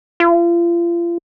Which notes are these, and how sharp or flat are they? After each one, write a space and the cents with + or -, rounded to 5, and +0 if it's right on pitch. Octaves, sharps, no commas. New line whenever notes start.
F4 -35